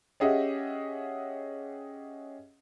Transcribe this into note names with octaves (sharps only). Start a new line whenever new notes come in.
C#4 G4 G#4 D#5 E5 F#5